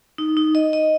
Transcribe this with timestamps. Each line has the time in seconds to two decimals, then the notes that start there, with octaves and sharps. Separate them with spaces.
0.18 D#4
0.37 D#4
0.55 D#5
0.73 D#5